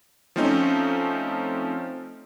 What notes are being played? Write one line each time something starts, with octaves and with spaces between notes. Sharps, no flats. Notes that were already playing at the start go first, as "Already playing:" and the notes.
F3 A3 C4 C#4 D#4